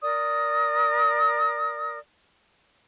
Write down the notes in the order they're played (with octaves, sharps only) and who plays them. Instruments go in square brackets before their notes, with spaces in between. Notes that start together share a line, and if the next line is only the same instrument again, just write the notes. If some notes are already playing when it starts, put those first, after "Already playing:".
[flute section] A#4 D5 D#6